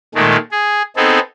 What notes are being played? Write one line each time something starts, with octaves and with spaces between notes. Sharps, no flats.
A#2 D#3 G#3 A3
G#4
B3 C4 D#4 G#4 A4